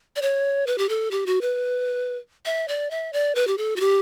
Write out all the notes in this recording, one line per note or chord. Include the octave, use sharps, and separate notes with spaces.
D5
C#5
B4
G4
A4
G4
F#4
B4
E5
D5
E5
D5
B4
G4
A4
F#4
G4